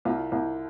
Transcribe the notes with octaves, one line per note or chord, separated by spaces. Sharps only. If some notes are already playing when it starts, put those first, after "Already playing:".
C2 F4
C2